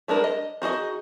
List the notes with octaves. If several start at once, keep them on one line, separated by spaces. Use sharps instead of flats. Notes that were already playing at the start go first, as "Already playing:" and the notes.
G3 G#3 D4 A#4
D#5
D#4 F#4 G#4 D#5